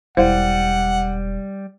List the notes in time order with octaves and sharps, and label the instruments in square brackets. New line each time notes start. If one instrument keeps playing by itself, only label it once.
[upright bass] E1 [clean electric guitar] G3 [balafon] E4 C5 F5 [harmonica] F#5